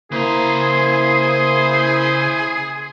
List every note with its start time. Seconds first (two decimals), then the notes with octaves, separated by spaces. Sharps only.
0.12 C#3 A#3 E4 G#4 C5 A#5